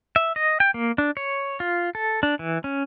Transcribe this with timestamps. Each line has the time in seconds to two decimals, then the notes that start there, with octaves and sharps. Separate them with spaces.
0.16 E5
0.36 D#5
0.60 G5
0.74 A#3
0.98 D4
1.17 C#5
1.60 F4
1.95 A4
2.23 D4
2.39 E3
2.64 C#4